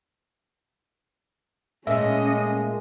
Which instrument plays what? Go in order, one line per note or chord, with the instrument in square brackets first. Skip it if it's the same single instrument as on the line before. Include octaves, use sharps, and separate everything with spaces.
[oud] A#2 A3 [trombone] G#3 [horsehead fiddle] C#4 D#5 [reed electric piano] E5